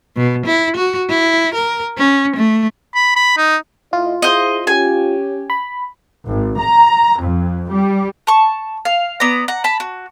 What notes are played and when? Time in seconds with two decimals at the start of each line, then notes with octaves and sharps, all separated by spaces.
0.16 B2
0.46 E4
0.77 F#4
1.09 E4
1.54 A#4
1.98 C#4
2.36 A3
2.95 B5
3.16 B5
3.37 D#4
3.93 A2 E4 F4 D#5
4.22 E4 G#4 C5 D#5
4.67 C#4 G4 G#5
5.50 B5
6.28 G#1
6.59 A#5
7.21 F2
7.71 G3
8.27 A5 C#6
8.85 F5
9.20 B3 D5 A#5
9.48 F#5 A#5
9.64 A5 B5
9.80 F#4